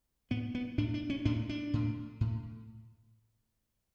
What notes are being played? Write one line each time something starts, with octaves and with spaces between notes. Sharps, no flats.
A2 B3
B3
A2 D4
D4
C#4
A2 D4
D4
A2
A2